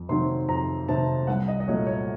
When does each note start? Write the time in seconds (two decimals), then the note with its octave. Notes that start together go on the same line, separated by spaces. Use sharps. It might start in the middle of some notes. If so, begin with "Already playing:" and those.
Already playing: F2
0.09 C3 D#3 F#3 C4 C6
0.49 F2 A#5
0.88 C3 D#3 F#3 C4 A5
1.27 C2 F#5
1.48 D#5
1.60 D#5
1.68 A#2 F#3 A3 C#5
1.87 C#5